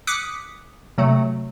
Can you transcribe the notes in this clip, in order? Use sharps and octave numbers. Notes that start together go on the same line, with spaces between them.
D6 D#6 F#6 B6 C#7
C3 F#3 A3